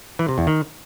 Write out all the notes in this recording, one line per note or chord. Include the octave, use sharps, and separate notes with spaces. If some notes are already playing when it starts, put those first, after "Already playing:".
E3
C3
E2
D#3